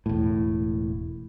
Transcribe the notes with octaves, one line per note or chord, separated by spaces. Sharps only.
E1 A2